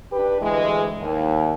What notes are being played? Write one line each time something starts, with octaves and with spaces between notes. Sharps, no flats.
D4 G4 B4
D2 G2 E3 G#3
D#2